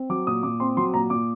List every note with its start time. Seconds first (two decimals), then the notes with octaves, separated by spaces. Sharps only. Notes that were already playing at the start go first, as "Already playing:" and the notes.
Already playing: C4
0.10 F#3 D6
0.27 A#2 D#6
0.43 A#2 D6
0.60 C4 C6
0.77 F#3 C6
0.94 A#2 A#5
1.10 A#2 D6